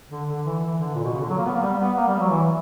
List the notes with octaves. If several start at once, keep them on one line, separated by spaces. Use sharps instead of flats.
D3
D3
E3
E3
D3
A#2
B2
C#3
D3
F#3
A#3
B3
A#3
G3
B3
A#3
G3
F#3
E3